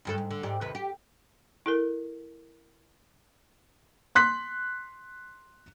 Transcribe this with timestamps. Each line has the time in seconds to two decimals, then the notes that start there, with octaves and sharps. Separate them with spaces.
0.05 D2 G2 A4
0.18 G#2
0.31 D3
0.43 G#2 G4 D5
0.61 D#2 C3 B4
0.75 G4
1.66 E4 A4 A#4
4.15 C6 F#6 B6